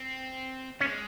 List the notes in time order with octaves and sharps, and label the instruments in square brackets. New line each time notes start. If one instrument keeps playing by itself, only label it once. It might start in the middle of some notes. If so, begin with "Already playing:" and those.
Already playing: [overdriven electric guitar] C4
[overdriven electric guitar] G#3 [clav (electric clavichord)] C#4